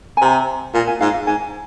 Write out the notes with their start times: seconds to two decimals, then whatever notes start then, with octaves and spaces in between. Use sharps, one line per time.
0.17 G#5
0.22 C3 A#5
0.74 A#2 G#5
0.87 G#5
1.01 G#2 F5
1.14 F5
1.27 G#2 G#5